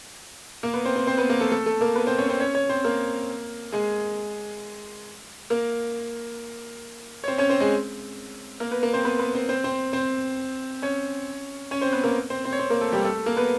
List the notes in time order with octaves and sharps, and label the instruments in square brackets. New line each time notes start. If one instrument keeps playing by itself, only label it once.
[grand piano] A#3 A#4
B3 B4
C4 C5
C4 C5
C4 C5
B3 B4
A#3 A#4
A3 A4
A3 A4
A3 A4
A#3 A#4
B3 B4
C4 C5
C#4 C#5
C4 C5
C#4 C#5
C#4 C#5
C4 C5
A#3 A#4
G#3 G#4
A#3 A#4
C#5
C4 C5
C#4 C#5
C4 C5
G#3 G#4
A#3 A#4
B3 B4
A#3 A#4
C4 C5
B3 B4
B3 B4
C4 C5
C4 C5
C4 C5
C4 C5
C#4 C#5
C#4 C#5
C4 C5
B3 B4
A#3 A#4
C4 C5
C4 C5
C#5
C4 C5
A#3 A#4
A3 A4
G3 G4
A3 A4
A#3 A#4
B3 B4